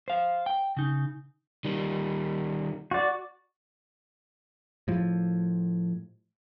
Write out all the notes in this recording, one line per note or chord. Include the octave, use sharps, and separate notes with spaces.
C5 F5
G5
C#3 D#4
D#3 G3
F#4 D5
A2 F3